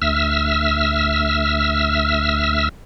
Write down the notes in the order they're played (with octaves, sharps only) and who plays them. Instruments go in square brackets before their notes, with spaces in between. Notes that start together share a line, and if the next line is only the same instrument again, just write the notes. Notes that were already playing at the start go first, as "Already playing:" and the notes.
[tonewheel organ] D2 E5 E6 F6